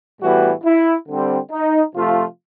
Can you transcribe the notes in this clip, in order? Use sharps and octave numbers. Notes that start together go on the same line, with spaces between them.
A2 E3 G3 B3 F#4
E4
D3 G3 C4
D#4
C3 F3 A3 F4